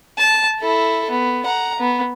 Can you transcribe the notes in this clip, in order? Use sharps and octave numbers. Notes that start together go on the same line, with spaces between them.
A5
E4 A4
B3
F#5 A#5
B3